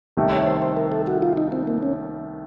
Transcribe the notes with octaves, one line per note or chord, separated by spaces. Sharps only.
C2 C3 D#3 A3
C#5
C#5
C5
C5
A#4
A4
F#4
F4
D#4
C4
A#3
C#4